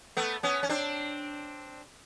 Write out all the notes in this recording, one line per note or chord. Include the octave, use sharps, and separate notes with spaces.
A3 B3
B3 C#4
C#4
C4 D4